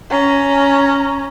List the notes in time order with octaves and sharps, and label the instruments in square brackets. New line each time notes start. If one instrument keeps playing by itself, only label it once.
[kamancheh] C#4 A#5